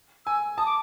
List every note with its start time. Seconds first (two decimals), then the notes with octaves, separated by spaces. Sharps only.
0.26 G#5 E6
0.58 A5 D#6
0.66 D6